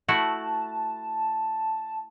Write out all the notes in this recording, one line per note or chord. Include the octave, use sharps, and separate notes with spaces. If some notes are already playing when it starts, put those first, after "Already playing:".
A3 E4 F#4 A5